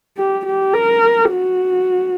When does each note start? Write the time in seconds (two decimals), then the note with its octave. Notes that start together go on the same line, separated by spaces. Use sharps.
0.17 G4
0.46 G4
0.74 A#4
1.31 F#4